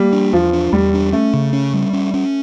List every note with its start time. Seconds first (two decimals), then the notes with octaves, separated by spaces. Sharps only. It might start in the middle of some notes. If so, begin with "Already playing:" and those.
Already playing: G3 A#3
0.13 D4
0.33 E2 F3
0.53 D4
0.72 E2 G3
0.94 D4
1.13 A3 C#4
1.33 C#3
1.53 C#4
1.74 G3
1.93 C#4
2.14 C#4